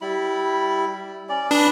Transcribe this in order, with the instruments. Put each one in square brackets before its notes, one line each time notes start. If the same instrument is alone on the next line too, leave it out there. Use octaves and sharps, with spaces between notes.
[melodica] G3 E4 B5
C#4 D5
[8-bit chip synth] D4 [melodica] B4 B5 D#6